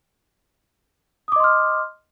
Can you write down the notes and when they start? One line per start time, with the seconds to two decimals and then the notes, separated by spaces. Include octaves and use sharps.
1.28 D#6
1.32 D6
1.36 D#5
1.40 C6
1.44 F6